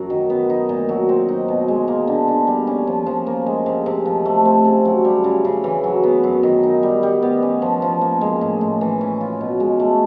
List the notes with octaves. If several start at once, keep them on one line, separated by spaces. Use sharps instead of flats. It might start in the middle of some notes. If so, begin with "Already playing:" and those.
Already playing: F#2 F#3
D#3
B3
D#4
A#2
F#3
C4
D#4
B2
G#3
A#3
D3
D3
G3
C#4
F3
F3
A#3
G#3
C3
C3
F3
A3
C4
C#3
F#3
G3
C#3
C#3
E3
F#3
B3
F#2
D#3
D#4
G3
G3
B3
C#4
F3
F3
A#3
G#3
A2
A2
E3
C#4
F4
B2
G#3
A3